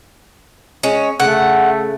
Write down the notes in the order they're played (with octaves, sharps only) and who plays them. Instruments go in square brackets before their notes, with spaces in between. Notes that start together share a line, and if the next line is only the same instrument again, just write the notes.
[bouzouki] G#3 C#4
[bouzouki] C#3 [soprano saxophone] A3 [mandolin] F#5